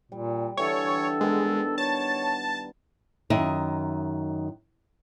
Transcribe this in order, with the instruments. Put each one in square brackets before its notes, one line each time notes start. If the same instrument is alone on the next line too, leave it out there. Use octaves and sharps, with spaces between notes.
[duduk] A#2 [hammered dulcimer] G3
[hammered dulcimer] D3 E3 G4 [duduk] A4 [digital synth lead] C#5
[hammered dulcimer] D#3 B3 D4 [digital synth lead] G#3
[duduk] C#5 [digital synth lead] A5
[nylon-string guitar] F#2 D#3 D#5 E5